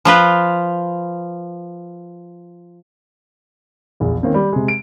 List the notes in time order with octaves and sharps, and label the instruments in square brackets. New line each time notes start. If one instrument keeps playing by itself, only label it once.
[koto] F3 F4 B4
[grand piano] A#1 E2
D#3 A#3 C4 C#4
G3
C3 G#3
D7